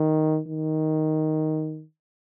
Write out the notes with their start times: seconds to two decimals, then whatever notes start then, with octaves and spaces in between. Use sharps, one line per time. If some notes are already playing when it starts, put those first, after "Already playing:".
Already playing: D#3
0.47 D#3